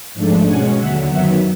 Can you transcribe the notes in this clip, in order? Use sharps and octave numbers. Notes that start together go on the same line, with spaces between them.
G#2 F3 A3 D4
B2 G#3 C#4 F#5 G#5
D#2 D3 F#3 E5 F#5
F#2 D#3 F#3 B3 E5 F#5